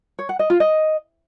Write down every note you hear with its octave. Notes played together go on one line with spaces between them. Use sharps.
C#5
F#5
D#5
F4
D#5